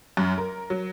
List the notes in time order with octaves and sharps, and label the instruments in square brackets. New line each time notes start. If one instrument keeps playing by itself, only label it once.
[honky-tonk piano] F#2
A#4
F#3